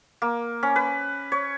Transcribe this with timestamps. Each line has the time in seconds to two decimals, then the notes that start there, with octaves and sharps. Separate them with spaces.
0.22 A#3
0.63 C#4
0.76 B4
1.32 C#5